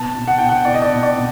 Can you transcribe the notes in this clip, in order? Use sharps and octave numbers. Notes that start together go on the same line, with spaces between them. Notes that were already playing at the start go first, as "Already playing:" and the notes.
Already playing: B2 A5
B2
F#5
B2 G5
F#5
B2 D5
D#5
D5
B2
D5
B2